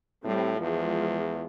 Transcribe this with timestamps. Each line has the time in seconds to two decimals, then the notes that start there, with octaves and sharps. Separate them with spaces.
0.24 A2 G3 C4
0.61 E2 F3 G#3 F4